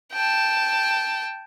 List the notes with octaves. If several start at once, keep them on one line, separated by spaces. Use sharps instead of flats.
G5 A5